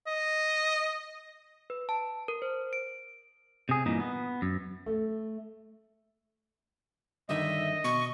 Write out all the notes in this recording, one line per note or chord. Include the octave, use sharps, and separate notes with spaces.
D#5
B4
A5
A#4
C5
D7
C3 G#4
G2 A#2 E3 D#4
B3
F#2
A3
G2 D3 D#3 D#5 E5
B2 C#6